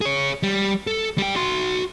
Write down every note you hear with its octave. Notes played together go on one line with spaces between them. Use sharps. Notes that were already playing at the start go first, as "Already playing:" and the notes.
G#4 C#5
G3
A4
G3 G5
F#4 C6